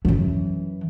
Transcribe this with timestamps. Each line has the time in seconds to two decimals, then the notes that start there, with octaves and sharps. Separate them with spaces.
0.05 F#2 E3